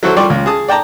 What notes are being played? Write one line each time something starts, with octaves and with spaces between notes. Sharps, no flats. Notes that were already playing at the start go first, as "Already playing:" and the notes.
F#3 E4 F#4 A4 C5
F3 G3 D5 C6 C#6
C#2
G#4 A5 D#6
D5 G5 A5 A#5